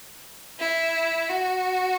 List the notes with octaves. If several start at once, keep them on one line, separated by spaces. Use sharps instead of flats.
E4
F#4